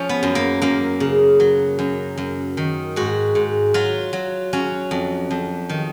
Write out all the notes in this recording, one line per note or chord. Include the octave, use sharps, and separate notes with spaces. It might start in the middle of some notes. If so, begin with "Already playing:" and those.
Already playing: F3 C#4
B3
F#2
A#3
F#2 A#3
C#3
F#3
F#2
F#2
D#3
G#2 F#4
G#2
F#3 F4
F#3
F#3 C#4
F2
F2
D#3